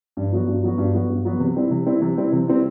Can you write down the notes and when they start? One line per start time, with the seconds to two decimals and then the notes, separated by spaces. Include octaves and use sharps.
0.17 G2
0.32 F#3 B3 F#4
0.47 G2
0.63 F#3 B3 F#4
0.78 G2
0.94 F#3 B3 F#4
1.09 G2
1.25 F#3 B3 F#4
1.40 C3
1.56 G3 C4 E4
1.71 C3
1.86 G3 C4 E4
2.02 C3
2.18 G3 C4 E4
2.33 C3
2.48 G3 C4 E4